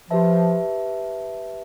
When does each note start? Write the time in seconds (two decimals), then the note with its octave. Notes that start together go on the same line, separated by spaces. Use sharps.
0.10 F3 G4 B4 E5 A5